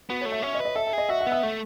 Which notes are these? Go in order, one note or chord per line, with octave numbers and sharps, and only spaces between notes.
B3 F#4
C#5
A3
E5
C#4 E5
D#5
B4
D#5
A4 E5
E5
G#4 D#5
F#4 E5
F#5
B3 E5
A3